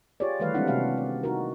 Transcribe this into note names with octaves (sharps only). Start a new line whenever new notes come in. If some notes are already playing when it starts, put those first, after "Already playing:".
F4 G4 G#4 C#5 D5
D#3 E3 G3 A3 B4 F5
G3 G#3 C4 D4 E4 F#5
C3 A#3 C#4 F#4 F5 F#5
D5
D#4 F#4 A#4